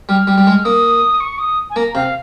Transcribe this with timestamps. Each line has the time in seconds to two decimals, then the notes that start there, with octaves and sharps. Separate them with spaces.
0.09 G3 F6
0.27 G3
0.38 G3
0.47 G#3
0.64 A#3 D#6
1.20 C#6
1.39 D#6
1.70 G#5
1.76 A#3 A#5
1.95 C3 F5